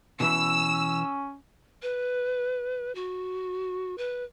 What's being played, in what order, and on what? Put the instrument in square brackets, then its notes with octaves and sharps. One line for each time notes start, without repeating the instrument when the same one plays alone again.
[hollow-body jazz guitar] B2 E3 B5 [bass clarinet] C#4 [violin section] E6
[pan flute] B4
F#4
B4